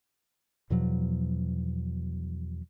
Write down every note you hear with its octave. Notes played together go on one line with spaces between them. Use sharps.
E2 B2 F3 F#3